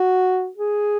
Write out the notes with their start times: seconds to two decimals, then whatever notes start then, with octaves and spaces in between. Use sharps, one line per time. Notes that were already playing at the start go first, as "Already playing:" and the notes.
Already playing: F#4
0.57 G#4